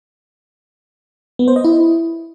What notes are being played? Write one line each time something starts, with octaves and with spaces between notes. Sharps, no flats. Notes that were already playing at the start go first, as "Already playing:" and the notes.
B3
C5
D#5
E4